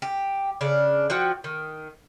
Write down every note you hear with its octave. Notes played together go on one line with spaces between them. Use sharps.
G4
C#3 D4 D5
F3 F#4 G5
D#3